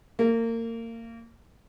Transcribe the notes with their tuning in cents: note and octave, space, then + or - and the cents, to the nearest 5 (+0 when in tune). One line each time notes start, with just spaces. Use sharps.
A#3 -30